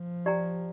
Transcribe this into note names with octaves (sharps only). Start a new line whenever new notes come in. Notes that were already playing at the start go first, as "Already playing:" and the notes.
Already playing: F3
G4 D5 G5 A#5